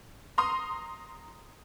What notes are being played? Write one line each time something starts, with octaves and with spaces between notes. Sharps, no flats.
A#5 C6 D#6